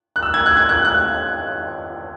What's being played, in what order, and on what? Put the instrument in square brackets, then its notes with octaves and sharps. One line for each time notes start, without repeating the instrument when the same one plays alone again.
[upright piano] F#6
E6
G#6
F#6
G#6
F#6
F#6